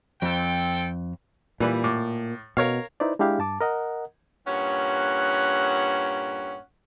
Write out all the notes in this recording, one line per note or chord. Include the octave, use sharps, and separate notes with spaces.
F2 C4 A4 G5
A#2 E3 G3 B4
A2 D6
B2 A#4 C#5 F5
D#4 E4 B4 C5 D5
G#3 D4 E4 G4 F5
G2 A5 D6
A#4 D#5 F#5
G2 A#2 C#4 F#5